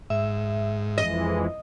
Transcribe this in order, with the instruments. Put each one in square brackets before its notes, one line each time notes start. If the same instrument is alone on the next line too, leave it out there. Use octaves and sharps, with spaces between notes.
[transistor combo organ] G#2 [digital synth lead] E5
[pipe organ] F2 E3 G#3 [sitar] D#5